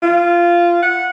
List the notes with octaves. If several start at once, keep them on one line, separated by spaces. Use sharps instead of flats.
F4
F#5